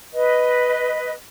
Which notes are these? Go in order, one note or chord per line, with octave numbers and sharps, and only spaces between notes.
B4 D#5